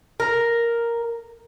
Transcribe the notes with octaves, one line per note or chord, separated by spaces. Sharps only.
A#4